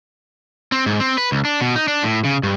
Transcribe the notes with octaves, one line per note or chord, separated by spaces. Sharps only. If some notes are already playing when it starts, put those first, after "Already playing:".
C4
G#2
C4
B4
C#2
D4
B2
D#4
D4
A2
C#3
G2